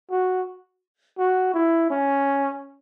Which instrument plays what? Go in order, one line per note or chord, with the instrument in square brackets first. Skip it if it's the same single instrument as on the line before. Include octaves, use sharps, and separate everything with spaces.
[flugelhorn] F#4
F#4
E4
C#4